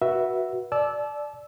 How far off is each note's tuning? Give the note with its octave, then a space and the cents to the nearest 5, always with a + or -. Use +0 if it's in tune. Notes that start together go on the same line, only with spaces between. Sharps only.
F#4 +0 B4 -25 E5 +0
D5 +0 A5 -35 E6 -5